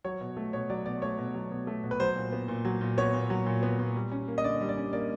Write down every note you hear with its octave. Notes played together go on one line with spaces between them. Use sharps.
F#3 C#5
B2
A3
B2 C#5
F#3 D5
B2 D5
A3 C#5
B2
F#3
B2
A3
B2
B4
F#3 C5
A#2
B3
A#2
F#3
A#2
B3 C#5
A#2
F#3
A#2
B3
A#2
G3
C#4
A#3
D#5
D3 D5
G3
D5
C#4
A#3 D5